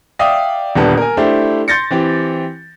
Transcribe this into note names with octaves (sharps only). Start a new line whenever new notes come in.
D5 E5 F5 G5 D#6
D#1 D3 G3 B3 A5
A#4 G#5
A3 D4 E4 G4 C5
C6 G6 A6 A#6 C#7
E3 C4 G4